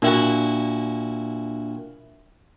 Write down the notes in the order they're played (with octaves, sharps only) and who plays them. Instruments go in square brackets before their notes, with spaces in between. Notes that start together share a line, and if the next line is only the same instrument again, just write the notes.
[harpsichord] A#2 E4 F#4 [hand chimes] D4 E5 G5